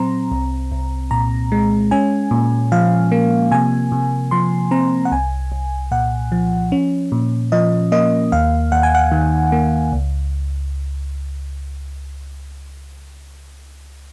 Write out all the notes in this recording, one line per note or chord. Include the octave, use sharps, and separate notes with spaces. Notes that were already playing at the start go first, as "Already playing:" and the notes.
Already playing: A#2 F#3 C4 A#5 C6
C2
C2
A#2 A#5
G#3
C#4 G#5
A#2
F3 F5
A#3
C3 G#5
C3
F3 C6
C4 A#5
F#5
C2 G#5
C2
A#2 F#5
F3
C#4
A#2
F3 D#5
A#3 D#5
D#2 F5
D#2 F#5
G#5
F#5
D#3
A#3
C#2